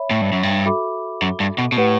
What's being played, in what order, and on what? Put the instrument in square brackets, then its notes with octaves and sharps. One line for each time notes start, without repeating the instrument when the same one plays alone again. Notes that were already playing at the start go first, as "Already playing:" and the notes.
Already playing: [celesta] C#5 E5 B5
[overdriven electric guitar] A2
G2
F#2
G2
[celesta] F#4 A4 E5 B5 D6
[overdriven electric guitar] F#2
G2
B2
B2
[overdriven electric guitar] A2 [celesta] G4 B4 F#5